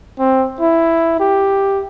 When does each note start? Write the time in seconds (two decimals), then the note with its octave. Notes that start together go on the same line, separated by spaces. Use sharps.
0.19 C4
0.61 E4
1.20 G4